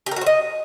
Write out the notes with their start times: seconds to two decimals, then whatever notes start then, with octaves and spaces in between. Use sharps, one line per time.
0.06 G4
0.11 A#4
0.16 F#4
0.21 C5
0.26 D#5